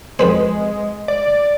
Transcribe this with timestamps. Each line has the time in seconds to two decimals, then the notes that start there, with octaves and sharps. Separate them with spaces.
0.19 F2 G#3 B4 C5
1.08 D5